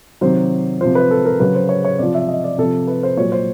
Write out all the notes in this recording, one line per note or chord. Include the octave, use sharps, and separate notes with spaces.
C3 D#3 F#3 C5
C3 F3 C5
B4
A4
A#4
C#3 F#3 B4
C5
C#5
C#5
C3 F3 D5
E5
D#5
D5
C3 F3 A4
B4
C5
A#2 F#3 C#5
C5